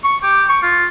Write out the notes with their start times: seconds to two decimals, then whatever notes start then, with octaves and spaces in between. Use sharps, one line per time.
0.04 C#6
0.23 G4
0.49 C#6
0.63 F4